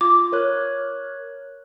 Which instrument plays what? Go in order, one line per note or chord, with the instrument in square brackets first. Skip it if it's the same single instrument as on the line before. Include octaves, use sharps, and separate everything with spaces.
[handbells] F4 [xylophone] D6
[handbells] A#4 C#5 F#6